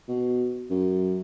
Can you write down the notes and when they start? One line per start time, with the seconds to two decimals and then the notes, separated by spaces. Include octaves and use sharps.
0.09 B2
0.71 F#2